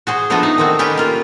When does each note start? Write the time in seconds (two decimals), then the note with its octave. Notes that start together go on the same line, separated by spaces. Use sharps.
0.07 F#4 G#4 C5
0.30 F3 A3 B3 D4 A4 D#5
0.43 D#4
0.58 D#3 C4 F#4
0.79 C#4 G4 B4 D5 G5 G#5
0.97 A#3 F4